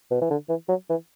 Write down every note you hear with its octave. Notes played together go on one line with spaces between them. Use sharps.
B2
E3
D3
E3
F#3
E3